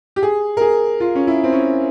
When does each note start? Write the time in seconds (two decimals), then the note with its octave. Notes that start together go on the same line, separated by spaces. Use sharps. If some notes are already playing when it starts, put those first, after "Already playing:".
0.16 G4
0.23 G#4
0.57 A#4
0.61 G#4
1.00 F4
1.15 C#4
1.27 E4
1.44 C4
1.53 C#4